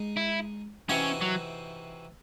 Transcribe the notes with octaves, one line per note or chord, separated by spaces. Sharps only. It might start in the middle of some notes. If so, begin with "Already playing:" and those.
Already playing: G#3 D#4 G#4
E4
C3 E3 C4 C#4 D#4 F#4
F#3